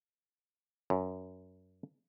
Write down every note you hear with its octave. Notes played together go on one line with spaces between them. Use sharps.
F#2